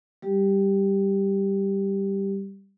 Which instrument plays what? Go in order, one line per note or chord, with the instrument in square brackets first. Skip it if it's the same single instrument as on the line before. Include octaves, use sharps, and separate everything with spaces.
[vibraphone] G3 G4